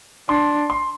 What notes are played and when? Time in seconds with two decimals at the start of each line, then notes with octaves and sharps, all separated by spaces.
0.29 D4 C6
0.70 C6